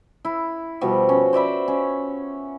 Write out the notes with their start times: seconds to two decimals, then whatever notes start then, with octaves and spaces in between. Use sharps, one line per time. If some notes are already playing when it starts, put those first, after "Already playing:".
0.25 E4
0.81 B2 F3 G3 F#4
1.09 C#4
1.33 C5 D5 E5 B5
1.68 C#4